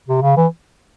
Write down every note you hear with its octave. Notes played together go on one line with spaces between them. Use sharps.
C3
C#3
E3